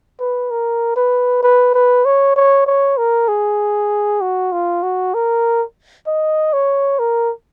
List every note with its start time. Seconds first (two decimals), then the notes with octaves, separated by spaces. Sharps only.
0.20 B4
0.51 A#4
0.96 B4
1.43 B4
1.74 B4
2.05 C#5
2.36 C#5
2.66 C#5
2.98 A#4
3.28 G#4
4.21 F#4
4.52 F4
4.83 F#4
5.14 A#4
6.07 D#5
6.53 C#5
6.99 A#4